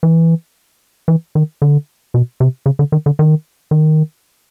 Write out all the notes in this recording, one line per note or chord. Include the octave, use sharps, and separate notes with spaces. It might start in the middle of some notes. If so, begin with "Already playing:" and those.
E3
E3
D#3
D3
B2
C3
C#3
D3
D#3
D3
D#3
D#3